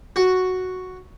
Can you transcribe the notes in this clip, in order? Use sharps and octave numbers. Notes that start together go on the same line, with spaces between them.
F#4